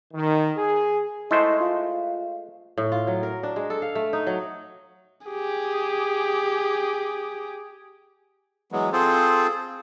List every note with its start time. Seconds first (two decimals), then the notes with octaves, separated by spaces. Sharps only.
0.14 D#3
0.56 G#4
1.31 G#3 A3 E4 C5 D#5
1.60 F4 F5
2.78 A2
2.92 F4
3.07 F#3
3.23 A#4
3.43 D4
3.56 G#3
3.70 A4
3.82 F5
3.95 A3
4.13 D#4
4.27 F#3
5.27 G4 G#4
8.72 E3 F#3 G#3 B3
8.92 C4 F4 G#4 A4 C5